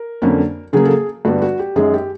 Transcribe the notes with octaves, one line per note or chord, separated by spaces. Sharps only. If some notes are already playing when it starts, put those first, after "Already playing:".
Already playing: A#4
F2 D3 F#3 A#3 C#4
C#3 F#3 A#3 G#4
A4
G#4
G2 D3 G3 B3 F#4
F#4
G4
F#2 D#3 G#3 G#4
G4